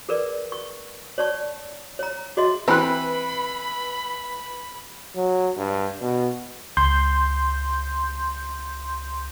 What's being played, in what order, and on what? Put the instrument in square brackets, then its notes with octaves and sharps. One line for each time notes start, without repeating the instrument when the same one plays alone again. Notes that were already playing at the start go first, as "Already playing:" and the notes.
[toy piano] G#4 A#4 B4 D5
C#6
C#5 D5 A5 C#6
C#5 A#5
F#4 G#4 C#5 D#5 E5 C6
[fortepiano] E3 F#6 [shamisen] C4 G4 C5 [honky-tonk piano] B4 [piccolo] B5
[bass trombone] F#3
G2
B2
[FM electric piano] C#2 C6 G6